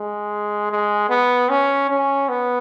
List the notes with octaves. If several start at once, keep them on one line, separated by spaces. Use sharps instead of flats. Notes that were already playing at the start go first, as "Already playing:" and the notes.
Already playing: G#3
G#3
B3
C#4
C#4
B3